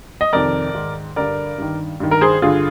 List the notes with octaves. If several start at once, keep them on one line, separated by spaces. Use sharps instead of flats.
D#5
F2 C3 D#3 A#4 D5
G#2 D#3
G2 D3 A#4 D5
G2 D#3
G2 D#3
A#4
G#4 C5
G2 D3 F4 G#4